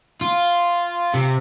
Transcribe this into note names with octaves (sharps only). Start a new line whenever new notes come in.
F4
C3